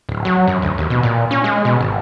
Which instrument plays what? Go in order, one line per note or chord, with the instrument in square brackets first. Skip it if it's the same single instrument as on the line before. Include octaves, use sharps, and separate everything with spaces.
[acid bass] D1
F#3
F#2
D2
D#2
B2
A#2
C#4
G#3
B2
G#1